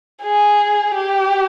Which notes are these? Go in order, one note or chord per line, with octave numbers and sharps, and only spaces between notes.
G#4
G4